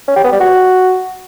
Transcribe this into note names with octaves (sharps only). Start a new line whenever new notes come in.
C#4
G4
B3
G3
F#4